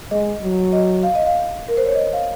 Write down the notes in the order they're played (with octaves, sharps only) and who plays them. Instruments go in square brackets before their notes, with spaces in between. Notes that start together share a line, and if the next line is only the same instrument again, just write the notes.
[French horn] G#3 [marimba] D#5
[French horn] F#3
[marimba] D#5
F5
D#5
F5
A#4
C5
C#5
D#5
F5